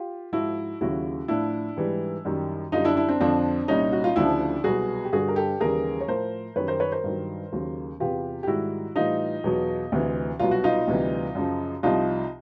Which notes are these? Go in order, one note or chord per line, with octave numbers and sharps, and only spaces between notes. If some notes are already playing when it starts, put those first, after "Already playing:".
Already playing: F4 G4
G#2 F3 E4 F#4
D#2 C#3 F#3 E4 F#4
A2 F3 D4 E4
G#2 E3 G3
F#2 D#3 G3
F#2 D3 G3 D#4 F4
D4 E4
D4 E4
C4 D4
F2 D3 F3 C4 D4
C2 A#2 G3 C#4 D#4
F#4
F4
D2 C#3 F3 D4 E4
C2 B2 F#3 F#4 G#4
G4
G2 D3 G3 F#4 G#4
A#4
G4 A4
D#2 C#3 E3 G3 G#4 A#4
C#5
A2 F3 A#4 C5
F#2 D#3 G3 B4 C#5
A#4 C5
B4 C#5
A#4 C5
G2 D#3 F#3
D#2 C#3 F#3
E2 C3 E3 F4 G4
G4
G#2 D#3 G3 E4 F#4
A2 E3 G3 D#4 F4
E2 B2 F#3
D2 C3 E3
C2 B2 F#3 F4
F#4
D#4 F4
D2 C3 E3 G3
F#2 C#3 F3
C2 C3 F3 D#4 F4